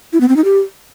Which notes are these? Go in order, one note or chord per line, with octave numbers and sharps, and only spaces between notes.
E4
B3
C4
D#4
G4